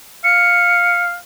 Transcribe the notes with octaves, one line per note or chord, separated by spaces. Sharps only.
F5 C#7